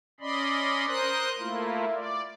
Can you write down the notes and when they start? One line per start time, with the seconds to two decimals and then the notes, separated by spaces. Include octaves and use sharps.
0.20 C#4 D5 D#5 B5 C6
0.87 A#4 C5 C6 D#6 F#6
1.39 A3 A#3 E4 F4
1.94 D5